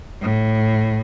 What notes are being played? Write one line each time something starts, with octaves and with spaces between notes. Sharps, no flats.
A2